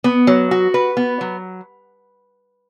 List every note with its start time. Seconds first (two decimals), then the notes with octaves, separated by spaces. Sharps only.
0.04 B3
0.27 F#3
0.51 F#4
0.74 B4
0.97 B3
1.21 F#3